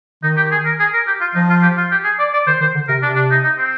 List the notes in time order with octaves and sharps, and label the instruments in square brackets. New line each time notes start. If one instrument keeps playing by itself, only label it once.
[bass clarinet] D#3 [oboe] D#4
[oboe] G4
G#4
A#4
G#4
A#4
G4
F4
[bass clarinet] F3 [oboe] D#4
[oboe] F4
G4
F4
G4
G#4
D5
D5
[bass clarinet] D#3 [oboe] C5
[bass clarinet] D#3 [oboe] C5
[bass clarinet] D3
[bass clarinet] C3 [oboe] A#4
[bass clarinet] C3 [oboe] D4
[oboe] D4
D#4
D#4
C4